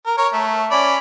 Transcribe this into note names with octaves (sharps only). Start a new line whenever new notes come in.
A#4
A#4 C#5
A3
C#4 D5 B5